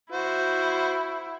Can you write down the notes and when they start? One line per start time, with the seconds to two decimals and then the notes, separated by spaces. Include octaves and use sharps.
0.12 E4 F#4 C5